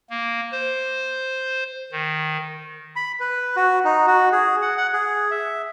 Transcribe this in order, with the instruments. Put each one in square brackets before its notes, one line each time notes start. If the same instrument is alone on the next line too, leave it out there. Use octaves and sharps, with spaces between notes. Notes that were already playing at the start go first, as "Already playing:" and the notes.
[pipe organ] A#3
C5
D#3
[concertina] B5
B4
F#4
D#4
F#4
G#4
F#5
F#5
G#4
E5